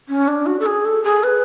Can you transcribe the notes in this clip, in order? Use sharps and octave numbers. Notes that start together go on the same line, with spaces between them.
C#4
D4
F#4
A4
G#4
A4
G#4
B4